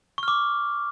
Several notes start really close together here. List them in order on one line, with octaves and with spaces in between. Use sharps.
C#6 F6 D6